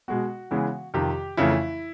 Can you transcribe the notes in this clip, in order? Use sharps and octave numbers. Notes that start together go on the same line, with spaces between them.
B2 G#3 B3 F#4
C#3 E3 G#3 B3
F2 C3 D#3 G4
F2 C#3 E3 A3 E4